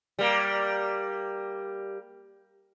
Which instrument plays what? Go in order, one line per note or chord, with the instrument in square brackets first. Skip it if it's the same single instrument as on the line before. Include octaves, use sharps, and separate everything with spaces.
[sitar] G3 A#3